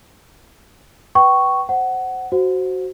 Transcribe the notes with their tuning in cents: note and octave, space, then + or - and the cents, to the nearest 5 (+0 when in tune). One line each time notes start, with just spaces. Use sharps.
B4 +0 G5 -35 C#6 +0
C5 +0 F#5 +15
F#4 +10 C5 +0 F#5 -35